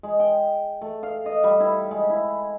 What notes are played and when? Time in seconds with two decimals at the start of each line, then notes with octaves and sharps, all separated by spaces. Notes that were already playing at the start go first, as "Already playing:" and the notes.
0.03 G#3
0.20 G5
0.82 A3
1.03 F5
1.26 D#5
1.44 G3
1.60 E4
1.91 G#3
2.10 E4